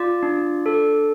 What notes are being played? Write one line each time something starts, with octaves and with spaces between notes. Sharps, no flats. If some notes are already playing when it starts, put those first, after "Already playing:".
Already playing: F4 D5
D4
A4